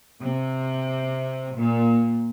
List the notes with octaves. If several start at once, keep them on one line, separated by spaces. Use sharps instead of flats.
C3
A#2